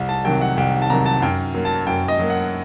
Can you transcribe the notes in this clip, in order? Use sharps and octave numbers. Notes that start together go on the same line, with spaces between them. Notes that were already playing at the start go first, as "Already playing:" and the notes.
Already playing: C2
A5
C3 D#3 F#3 G5
F#5
C2 G5
A5
C3 D#3 F#3 A#5
A5
F#2 G5
F#3 A#3
A5
F#2 G5
D#5
F#3 A#3
F#5